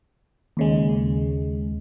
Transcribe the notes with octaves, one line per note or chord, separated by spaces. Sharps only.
D#2 C#3 G#3